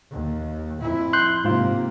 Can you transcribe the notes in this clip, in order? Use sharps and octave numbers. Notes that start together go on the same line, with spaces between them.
D#2
F2 E4
C6 F#6 G6
G#2 C3 A#3 F4